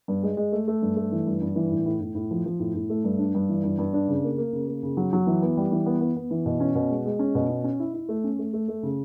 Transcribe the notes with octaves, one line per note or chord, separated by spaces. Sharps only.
G2
G#3
G#3
A3
A3
G2
A3
E3
G2
G2
E3
A2
A2
A2
A2
F3
F3
A2
A2
A3
G2
D4
G2
E3
G2
G2
D4
C#3
A#3
A#3
C#3
A#3
C#3
F#3
F#3
E3
B3
G3
E3
B3
B3
B3
E3
B2
C#4
B2
G#3
G#3
C#4
B2
C#4
C#4
E4
E4
A3
C#4
A3
A3
A3
C#3